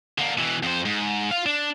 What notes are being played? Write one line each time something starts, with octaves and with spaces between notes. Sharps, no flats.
D3 A#3
B2 E3
F2 C5
G#2
F4 F5
D4